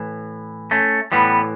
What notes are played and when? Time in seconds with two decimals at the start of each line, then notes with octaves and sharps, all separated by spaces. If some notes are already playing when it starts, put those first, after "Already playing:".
Already playing: A2 E3
0.71 A3 C#4
1.12 A2 E3 G3 B3